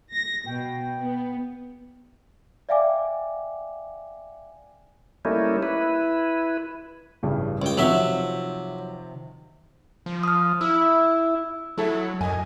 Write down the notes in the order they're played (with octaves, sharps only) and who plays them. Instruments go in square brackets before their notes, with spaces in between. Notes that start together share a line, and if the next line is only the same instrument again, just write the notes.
[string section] A#6
[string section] B2 [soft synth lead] G5
[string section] B3
[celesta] D5 E5 F5 G5 G#5 D6
[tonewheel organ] G3 A3 A#3 C#4 D#4 E4
E4 B4
[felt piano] A1 G2 C#3
[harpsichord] C#2 G5
[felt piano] C3 D#3 F3 [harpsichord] F#3 E5
[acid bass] F3
[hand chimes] D#6 F6
[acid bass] E4 [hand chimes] E6
[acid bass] F#3 [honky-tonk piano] A3 E4 A4
[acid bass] F#2 [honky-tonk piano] D#5 G#5